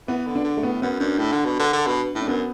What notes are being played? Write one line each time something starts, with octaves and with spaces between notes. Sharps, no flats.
E3 B3
D3
D4
D3
A3
A2 B3
F#2 B3
F#2 D4
A2
D3
B2
D3
D3
B2
A2
D4
F#2 B3